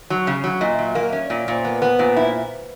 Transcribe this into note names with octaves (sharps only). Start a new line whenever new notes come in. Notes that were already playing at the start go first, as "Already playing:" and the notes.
F#3
C#3
F#3
A#2 D#5
E5
F#3
E5
A#3 F5
C#4 E5
A#2 D5
C#5
A#2 C5
B3 A#4
B3 B4
C5
A#2 B4
E4 C5